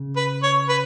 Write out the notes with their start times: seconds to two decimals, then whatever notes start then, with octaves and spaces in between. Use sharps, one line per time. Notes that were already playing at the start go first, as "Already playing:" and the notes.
Already playing: C#3
0.16 B4
0.43 C#5
0.69 B4